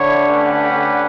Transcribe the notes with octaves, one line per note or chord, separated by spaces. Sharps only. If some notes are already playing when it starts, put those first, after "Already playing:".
Already playing: D3 E4 C#5
A3 C#4 G4 B4 F#5
D3